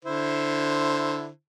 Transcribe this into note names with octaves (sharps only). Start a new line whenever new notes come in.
D3 E4 C5